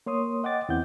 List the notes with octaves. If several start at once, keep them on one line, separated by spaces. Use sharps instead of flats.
A#3 C#5 C6 D#6
D#5 F#5 G5 D6 A6
E2 E3 C4 F#5 G6